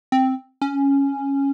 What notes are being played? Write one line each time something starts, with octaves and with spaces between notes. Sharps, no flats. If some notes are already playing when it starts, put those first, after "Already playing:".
C4
C#4